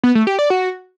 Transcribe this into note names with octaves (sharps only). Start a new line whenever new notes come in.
B3
A3
G4
D5
F#4